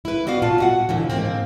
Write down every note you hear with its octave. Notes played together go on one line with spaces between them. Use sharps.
E4 B4
B3 F#4 D5 F5
A#2 F4 A5
B2 F#4 F#5
D#2 A#2 D3 E3
G#2 A#3 C4